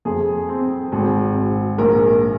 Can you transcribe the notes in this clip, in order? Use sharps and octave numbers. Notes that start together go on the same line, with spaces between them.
F2 G#4
C4
G#1
G#1
A#1 A#4